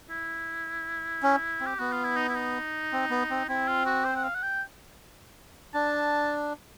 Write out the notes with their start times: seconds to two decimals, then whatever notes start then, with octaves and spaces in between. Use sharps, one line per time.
0.10 E4
1.23 C#4
1.61 C4
1.66 G4
1.79 B3 F#4
1.92 F4
2.04 E4
2.17 D#4
2.29 E4
2.36 D#4
2.92 C4
3.10 B3
3.30 C4
3.48 C4 E4
3.67 F4
3.86 F#4
4.05 C5
4.16 F#5
4.24 F5
4.35 F#5
4.42 G5
5.74 D4 A5